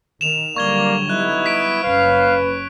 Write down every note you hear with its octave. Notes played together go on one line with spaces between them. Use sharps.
D#3 E7 F7
D3 F#3 G3 A#3 D5 C#6 G#6 G7
B3 D#4 E4 F#6
B6 D7
F#1 C#4 B4 F5